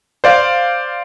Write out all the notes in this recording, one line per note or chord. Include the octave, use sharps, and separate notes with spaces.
C5 D5 F5